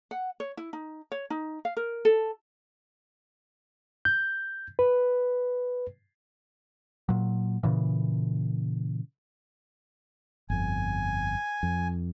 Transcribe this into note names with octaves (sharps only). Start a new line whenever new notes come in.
F#5
C#5
E4
D#4
C#5
D#4
F5
A#4
A4
G6
B4
A#2 F#3
A#2 C#3 E3
G1 F2 G#5
F2